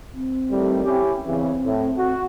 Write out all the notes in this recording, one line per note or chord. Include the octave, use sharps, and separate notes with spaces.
C4
A2 D#3 G3
C#4 E4 G4
E2 C#3 E3 C4
A2
F#4